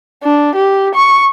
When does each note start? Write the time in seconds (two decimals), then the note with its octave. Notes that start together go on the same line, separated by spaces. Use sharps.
0.23 D4
0.55 G4
0.95 C#6